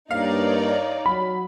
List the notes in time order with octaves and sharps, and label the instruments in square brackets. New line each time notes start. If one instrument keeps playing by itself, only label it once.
[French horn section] G2 A#3 [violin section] D#4 C#5 D5 [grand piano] F5
[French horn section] F#3 [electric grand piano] B5